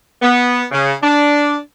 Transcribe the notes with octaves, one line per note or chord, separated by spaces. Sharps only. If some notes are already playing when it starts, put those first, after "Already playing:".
B3
C#3
D4